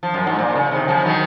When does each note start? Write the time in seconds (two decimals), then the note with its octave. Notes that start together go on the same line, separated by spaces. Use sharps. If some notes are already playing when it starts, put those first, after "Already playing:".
0.03 F3
0.14 F#2
0.27 G#2
0.39 A#2
0.55 C#3
0.71 C3 D#3
0.88 C#3 F3
1.05 D#3 F#3